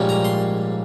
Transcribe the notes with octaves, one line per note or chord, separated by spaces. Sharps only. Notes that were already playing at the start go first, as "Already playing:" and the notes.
Already playing: A#1 G#2 G3 A#3 C#4
A#5
C6